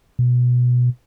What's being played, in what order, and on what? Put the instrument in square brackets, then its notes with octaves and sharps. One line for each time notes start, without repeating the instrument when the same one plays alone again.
[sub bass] B2